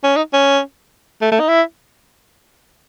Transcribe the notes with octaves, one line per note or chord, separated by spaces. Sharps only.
C#4
D#4
C#4
A3
A3
D#4
E4